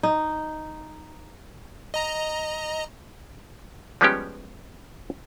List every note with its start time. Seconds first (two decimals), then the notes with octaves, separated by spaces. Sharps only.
0.03 D#4
1.94 D#5 A#5
4.01 F3 G3 G#3 B3 C#4 G4